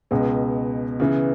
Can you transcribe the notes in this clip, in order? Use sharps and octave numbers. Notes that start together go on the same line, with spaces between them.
C#2 B2 G#3
C#3 E3 B3